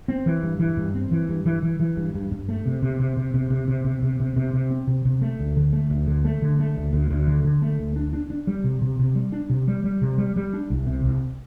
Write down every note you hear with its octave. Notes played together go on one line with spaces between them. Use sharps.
C4
E3
G2
E3
G2
C4
E3
G2
E3
E3
E3
G2
G2
G2
A3
C3
C3
C3
C3
C3
C3
C3
C3
C3
C3
C3
C3
C4
C3
C3
A3
D2
D3
A3
D2
D3
A3
D3
A3
D2
D2
D2
D3
D3
A3
D2
D4
D4
D4
G3
C3
C3
C3
G3
D4
C3
G3
G3
C3
G3
G3
D4
C2
C3
C2